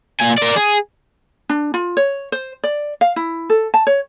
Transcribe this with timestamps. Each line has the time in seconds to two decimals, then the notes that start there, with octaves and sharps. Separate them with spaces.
0.20 A#2 G#5
0.38 A#4 D5
0.56 G#4
1.49 D4
1.74 F4
1.97 C#5
2.32 C5
2.64 D5
3.01 F5
3.16 E4
3.50 A4
3.74 A5
3.87 C#5